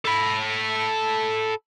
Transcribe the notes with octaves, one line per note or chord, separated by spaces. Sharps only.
A4 B5